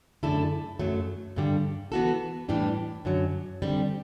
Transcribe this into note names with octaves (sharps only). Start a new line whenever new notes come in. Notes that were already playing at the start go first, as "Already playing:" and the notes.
F#2 D3 A3 E4 A4
F#2 F#3 A3
G2 D3 G3
E3 B3 F#4 A4
A2 E3 G3 D4 G4
F#2 D3 F#3
D3 G3 C4